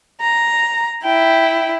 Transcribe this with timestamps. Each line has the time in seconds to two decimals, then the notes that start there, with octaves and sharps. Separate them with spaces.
0.21 A#5
1.04 E4 G5